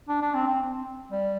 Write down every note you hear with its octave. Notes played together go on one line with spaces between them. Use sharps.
D4
D4
C4
C4
G3